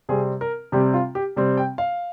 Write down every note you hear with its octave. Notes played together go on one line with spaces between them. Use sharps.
C3 G3 C4 G#4
A#4
C3 G3 C4 G4
F4
G4
C3 G3 C4
G5
F5